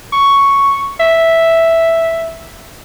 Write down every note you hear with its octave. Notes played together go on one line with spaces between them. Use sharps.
C#6
E5